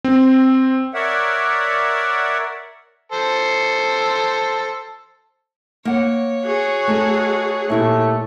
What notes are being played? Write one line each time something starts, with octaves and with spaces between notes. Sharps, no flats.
C4
A#4 C#5 D5 E5 F#5
A4 C5
A#3 C#5 F#5
F#4 G#4
A3 D#4
A#2 A3 E4 G4